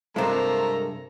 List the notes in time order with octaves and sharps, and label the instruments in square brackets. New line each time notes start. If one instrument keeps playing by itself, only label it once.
[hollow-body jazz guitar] G2 C3 G#3 [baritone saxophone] A3 [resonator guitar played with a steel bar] F4 C5 [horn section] A#4 A#5